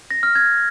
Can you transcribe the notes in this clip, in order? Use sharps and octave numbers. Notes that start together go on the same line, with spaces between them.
A#6
F6
G#6